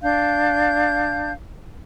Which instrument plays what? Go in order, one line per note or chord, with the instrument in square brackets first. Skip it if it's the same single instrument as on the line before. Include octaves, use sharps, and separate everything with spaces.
[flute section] D4 F5 G6